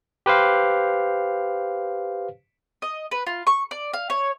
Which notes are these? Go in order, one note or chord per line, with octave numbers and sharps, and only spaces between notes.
G4 B4 C5 F5
D#5
B4
F4
C#6
D5
F5
C#5